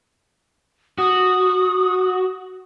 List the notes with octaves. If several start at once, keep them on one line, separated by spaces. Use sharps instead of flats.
F#4 D#6